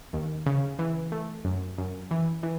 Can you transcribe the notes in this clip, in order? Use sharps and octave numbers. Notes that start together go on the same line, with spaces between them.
D#2
C#3
E3
A3
F#2
F#2
E3
E3